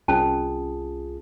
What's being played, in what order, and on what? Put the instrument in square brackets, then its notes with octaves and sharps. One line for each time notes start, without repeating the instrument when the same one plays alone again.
[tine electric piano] C2 F4 G#4 [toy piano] C#4 A5